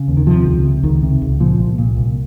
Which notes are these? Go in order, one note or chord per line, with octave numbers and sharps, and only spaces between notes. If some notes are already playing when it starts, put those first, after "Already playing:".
Already playing: C#3
D#2
D#3
C3 F3
C#2
C3
C#2 D#3
C3
C#2
A#2 F3
C2
A#2
C2